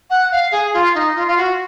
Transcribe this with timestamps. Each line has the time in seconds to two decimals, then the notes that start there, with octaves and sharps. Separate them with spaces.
0.10 F#5
0.32 F5
0.52 G#4
0.74 F4
0.95 D#4
1.16 F4
1.27 F4
1.37 F#4